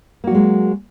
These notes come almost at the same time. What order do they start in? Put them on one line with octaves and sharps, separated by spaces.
A#3 F#4 F#3 G#3